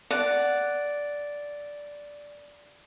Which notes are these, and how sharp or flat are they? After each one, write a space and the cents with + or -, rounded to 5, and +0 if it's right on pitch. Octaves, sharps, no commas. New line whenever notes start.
D5 -5 F#5 +0